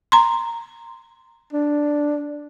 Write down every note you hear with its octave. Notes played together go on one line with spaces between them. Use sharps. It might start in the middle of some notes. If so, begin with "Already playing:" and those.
A#5 C6
D4